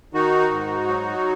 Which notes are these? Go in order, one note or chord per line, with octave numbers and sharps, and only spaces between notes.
D#3 D#4 F#4
G#2
F#3